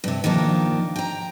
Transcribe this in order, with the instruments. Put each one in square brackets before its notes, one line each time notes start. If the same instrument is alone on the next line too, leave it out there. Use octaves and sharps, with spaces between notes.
[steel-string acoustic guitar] G2 C3
D#3 F3 A#3 D4
G5 A#5